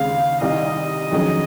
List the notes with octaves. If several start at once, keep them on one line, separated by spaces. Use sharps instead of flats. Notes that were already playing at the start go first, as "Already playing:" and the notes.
Already playing: D#2 C#3 G#3 C4 F5
C2 C3 D#3 D#5
F2 D#3 F#3 C#4 G#4